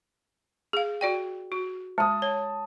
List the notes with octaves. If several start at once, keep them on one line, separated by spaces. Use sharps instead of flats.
G#4 F5
F#4 D5 G5
F#4
G#3 A5 D#6
C#5